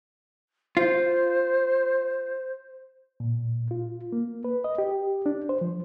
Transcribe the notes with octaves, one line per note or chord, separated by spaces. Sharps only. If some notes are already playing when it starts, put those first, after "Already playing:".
F4 C5
A#2
F4
A#3
B4
D#5
G4
D4
C5
F3